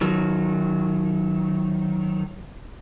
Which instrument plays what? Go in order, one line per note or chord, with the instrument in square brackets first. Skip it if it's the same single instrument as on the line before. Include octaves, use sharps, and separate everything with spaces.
[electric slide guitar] D#3 F#3